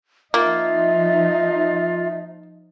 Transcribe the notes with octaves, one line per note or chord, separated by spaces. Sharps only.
F3 A#3 D#4 F4 E5